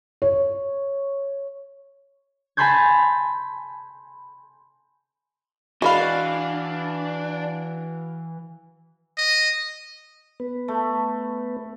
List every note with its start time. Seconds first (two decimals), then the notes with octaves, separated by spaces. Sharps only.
0.22 C#5
2.57 G#5 A5 B5 C6 G6 G#6
5.82 E3 G#3 D4 F#4 B4 F5 B5
9.17 D#5
10.40 B3 B4
10.68 A3